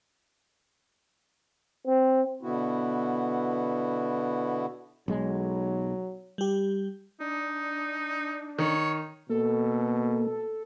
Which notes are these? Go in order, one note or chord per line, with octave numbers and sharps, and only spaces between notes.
C4
B2 D3 B3 E4 F#4
B1 F#3 G#3
G3 G4
D4 D#4
D#3 C#5
B2 A#3 A4